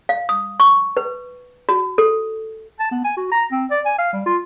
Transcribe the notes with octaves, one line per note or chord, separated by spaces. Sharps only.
F5
D#6
C#6
B4
F#4
A4
A5
B3
G#5
F#4
A#5
C4
D5
G#5
F5
G3
F4